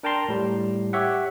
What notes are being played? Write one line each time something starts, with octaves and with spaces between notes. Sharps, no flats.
D4 A#4 G5 A5 A#5 C6
A2 G3
G4 C#5 E5 F#5